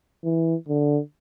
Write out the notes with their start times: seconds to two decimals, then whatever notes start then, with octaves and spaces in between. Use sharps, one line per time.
0.24 E3
0.68 D3